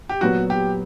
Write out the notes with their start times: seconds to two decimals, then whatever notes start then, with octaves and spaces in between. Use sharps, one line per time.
0.09 G4
0.21 A#2 F#3 B3 F#4
0.50 G4